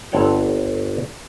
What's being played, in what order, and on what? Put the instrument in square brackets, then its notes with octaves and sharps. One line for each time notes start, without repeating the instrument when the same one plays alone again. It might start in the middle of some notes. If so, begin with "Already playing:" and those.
[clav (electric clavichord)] G1 C4 A4 C#5 F#5 G5